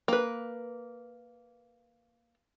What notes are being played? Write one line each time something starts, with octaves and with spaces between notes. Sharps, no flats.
A#3 B4